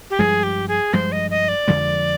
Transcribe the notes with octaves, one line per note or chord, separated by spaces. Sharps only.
G4
G2 F3 G#3 G#4
G4
G#4
G2 F3 G#3 C5
D#5
D#5
D5
F2 D3 F3 G#3